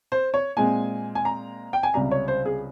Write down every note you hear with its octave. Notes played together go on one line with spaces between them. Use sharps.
C5
C#5
A#2 G#3 C4 G#5
G#5
A#5
G5
G#5
C#2 C3 G3 C4 A#5
C#5
C5
G#4